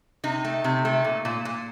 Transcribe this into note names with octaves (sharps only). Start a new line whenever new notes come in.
C3 D#4
A3
C3
A3
A#2
A#2
A#2